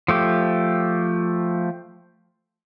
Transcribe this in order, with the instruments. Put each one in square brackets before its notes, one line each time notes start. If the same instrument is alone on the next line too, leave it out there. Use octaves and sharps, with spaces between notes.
[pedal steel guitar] F3 A3 G4